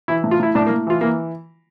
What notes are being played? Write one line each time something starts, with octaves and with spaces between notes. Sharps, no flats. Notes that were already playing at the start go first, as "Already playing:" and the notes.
E3 E4
A2
F4
A2 E4
A2 D4
A#3
A2
E3 F4
E3 A#3